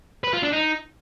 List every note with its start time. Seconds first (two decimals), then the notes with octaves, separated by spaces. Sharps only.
0.24 B4
0.33 F4
0.43 D4
0.53 D#4